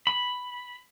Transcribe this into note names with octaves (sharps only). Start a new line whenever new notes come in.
B5